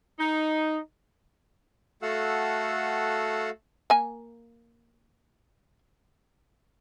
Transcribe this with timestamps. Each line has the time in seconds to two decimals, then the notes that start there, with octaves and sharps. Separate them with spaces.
0.20 D#4
2.02 A3 F#4 A4 F5 F#5 E6
3.90 A#3 G#5